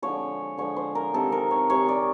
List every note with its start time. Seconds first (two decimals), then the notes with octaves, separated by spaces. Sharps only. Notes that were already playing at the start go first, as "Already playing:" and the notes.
0.02 D3 F3 G#3 C#5
0.58 D3 F3 G#3 C#5
0.77 C5
0.95 A#4
1.14 C3 D#3 G#3 A4
1.32 A#4
1.51 C#5
1.70 C3 D#3 G#3 C#5
1.89 D5